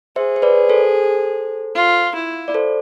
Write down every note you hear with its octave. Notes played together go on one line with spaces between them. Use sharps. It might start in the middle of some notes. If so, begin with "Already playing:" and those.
G#4 C5 E5
C5
B4 D5
A4 C5
F4
E4
D5
A4 C5